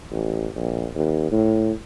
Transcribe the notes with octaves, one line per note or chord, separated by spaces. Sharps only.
A1
A#1
D#2
A2